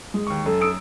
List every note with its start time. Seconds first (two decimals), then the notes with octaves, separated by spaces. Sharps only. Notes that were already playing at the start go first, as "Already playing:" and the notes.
0.14 G#3
0.27 D#2 C#6
0.46 F#2 A4
0.61 D#6 E6 D7